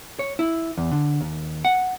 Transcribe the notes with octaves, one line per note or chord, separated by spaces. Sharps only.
C#5
E4
E2
D3
D#2
F#5